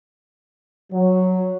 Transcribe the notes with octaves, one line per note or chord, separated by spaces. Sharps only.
F#3